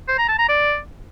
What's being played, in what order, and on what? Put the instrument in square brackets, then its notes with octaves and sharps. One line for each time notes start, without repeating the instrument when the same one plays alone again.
[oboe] C5
A#5
A5
A#5
D5